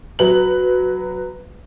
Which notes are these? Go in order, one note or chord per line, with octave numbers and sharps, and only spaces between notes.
F#3 B4 F#7